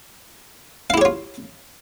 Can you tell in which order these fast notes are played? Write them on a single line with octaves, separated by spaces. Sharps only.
F5 E4 G4 C#5 F4